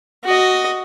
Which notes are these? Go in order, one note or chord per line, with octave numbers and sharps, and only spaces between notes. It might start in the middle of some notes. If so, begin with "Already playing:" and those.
F#4 D#5